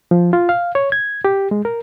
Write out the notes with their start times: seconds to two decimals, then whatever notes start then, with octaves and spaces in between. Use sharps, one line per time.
0.11 F3
0.33 F4
0.49 F5
0.75 C#5
0.92 G#6
1.25 G4
1.51 G#3
1.65 A#4